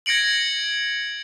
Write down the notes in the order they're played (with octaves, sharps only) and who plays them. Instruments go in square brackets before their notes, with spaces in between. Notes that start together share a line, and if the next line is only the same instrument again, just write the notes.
[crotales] G#6 A#6 C#7 D7 F#7